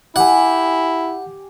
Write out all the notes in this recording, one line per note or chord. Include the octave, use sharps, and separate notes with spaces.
E4 G4 F#5 G#5